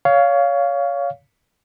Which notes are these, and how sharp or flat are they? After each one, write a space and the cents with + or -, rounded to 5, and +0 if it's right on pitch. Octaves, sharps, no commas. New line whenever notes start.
C#5 +25 F5 +0